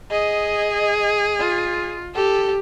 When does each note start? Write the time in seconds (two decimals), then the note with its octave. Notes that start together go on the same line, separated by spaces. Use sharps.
0.11 G#4 D#5
1.39 F4
2.15 G4 A4